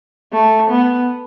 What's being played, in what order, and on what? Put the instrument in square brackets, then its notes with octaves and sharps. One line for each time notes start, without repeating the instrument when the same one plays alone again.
[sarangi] A3
B3